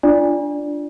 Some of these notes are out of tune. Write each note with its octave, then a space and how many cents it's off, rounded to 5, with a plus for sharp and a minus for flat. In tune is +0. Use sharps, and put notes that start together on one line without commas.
D4 +0 F4 -15 D5 +0